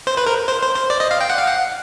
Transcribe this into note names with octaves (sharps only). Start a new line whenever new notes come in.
C5
B4
A#4
C5
C5
C5
D5
D#5
F5
G5
F#5
F5
F#5